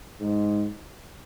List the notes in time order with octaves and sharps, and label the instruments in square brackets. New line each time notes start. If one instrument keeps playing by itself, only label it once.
[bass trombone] G#2